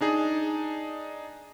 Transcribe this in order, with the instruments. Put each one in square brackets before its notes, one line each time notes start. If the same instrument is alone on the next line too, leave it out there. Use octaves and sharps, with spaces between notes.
[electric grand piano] D4 D#4 G#4